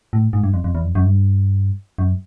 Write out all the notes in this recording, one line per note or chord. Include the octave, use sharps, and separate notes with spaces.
A2
G#2
G2
F2
F2
E2
F2
F#2
G2
F#2